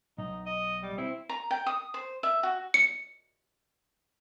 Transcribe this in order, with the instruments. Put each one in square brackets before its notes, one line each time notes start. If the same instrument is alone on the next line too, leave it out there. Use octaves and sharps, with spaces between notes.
[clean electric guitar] B1 [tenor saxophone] D#4
[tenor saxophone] D#5
G3
[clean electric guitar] C4 [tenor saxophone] E4
[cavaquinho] A#5
G5
D#6
C5
E5
F#4
[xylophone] C#7